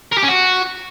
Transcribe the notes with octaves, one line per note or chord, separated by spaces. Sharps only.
A#4
G4
C#4
F#4